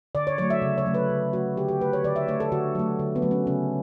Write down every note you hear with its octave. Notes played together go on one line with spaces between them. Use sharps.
D3 D5
C#5
F#3 A3 C#5
E5
C#3
C#5
F#3 A3
B4
C#3
F#3 A3 F#4
D3 G4
G4
A3 B4
C#5
D3 D5
E5
A3 C#5
A4
D3 F#4
F#3 A3
D3
B3
F#3 A3
C#4
C#3 C#4